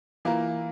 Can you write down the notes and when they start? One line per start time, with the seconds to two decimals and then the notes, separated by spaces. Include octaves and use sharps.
0.25 E3 A#3 F4 A#4